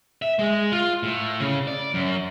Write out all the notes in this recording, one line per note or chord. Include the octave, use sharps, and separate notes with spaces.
E5
G#3
F4
A2
C#3
D5
F#2